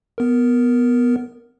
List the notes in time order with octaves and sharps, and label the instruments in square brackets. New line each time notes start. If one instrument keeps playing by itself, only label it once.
[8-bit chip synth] B3 A#4